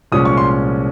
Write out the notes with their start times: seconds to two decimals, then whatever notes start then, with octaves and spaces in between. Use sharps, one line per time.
0.12 C2 A#2 F3 G#3 C#4 D#6
0.25 C#6
0.37 C6